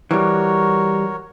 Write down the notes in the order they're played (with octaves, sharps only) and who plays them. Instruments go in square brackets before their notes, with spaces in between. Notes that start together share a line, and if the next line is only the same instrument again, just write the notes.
[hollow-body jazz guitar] E3 G3 [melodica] F#4 A#4 C#5